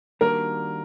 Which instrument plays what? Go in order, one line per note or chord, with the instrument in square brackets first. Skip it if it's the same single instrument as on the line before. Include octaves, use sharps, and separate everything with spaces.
[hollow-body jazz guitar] D#3 G3 A#3 D4 F#4 [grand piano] A#4